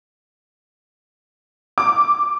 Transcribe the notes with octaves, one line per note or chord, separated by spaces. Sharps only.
D6